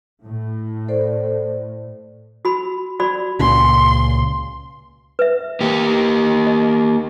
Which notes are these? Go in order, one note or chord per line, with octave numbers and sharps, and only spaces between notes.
A2
A4 C5 D5
F#4 B5
F#4 D5 B5
C#2 A#2 C#3 C6
B4 E5
A#3 G4
D#5